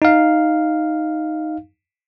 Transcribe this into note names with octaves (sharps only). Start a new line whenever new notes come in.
D#4 F5